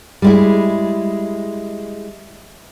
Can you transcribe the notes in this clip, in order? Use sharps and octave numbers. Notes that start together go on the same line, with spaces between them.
G3 G#3 E4